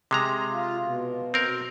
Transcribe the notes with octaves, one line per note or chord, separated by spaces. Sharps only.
C3 G#3 A#5
F4
B2
C4 A#4